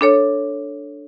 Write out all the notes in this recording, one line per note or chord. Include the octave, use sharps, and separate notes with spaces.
D4 A4 C#5